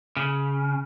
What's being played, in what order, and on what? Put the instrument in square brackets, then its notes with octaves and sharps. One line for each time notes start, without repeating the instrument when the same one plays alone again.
[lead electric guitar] C#3